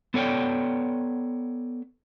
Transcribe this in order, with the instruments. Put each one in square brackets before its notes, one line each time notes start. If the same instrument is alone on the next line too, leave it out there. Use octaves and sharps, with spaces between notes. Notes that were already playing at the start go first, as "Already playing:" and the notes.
[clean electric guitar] B3 A4 C#5 D5 G5